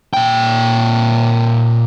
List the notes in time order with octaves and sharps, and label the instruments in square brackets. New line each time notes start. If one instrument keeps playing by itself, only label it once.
[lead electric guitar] A#2 G5